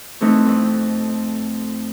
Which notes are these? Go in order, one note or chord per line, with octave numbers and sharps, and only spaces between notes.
E3 A3 C4 D#4
F2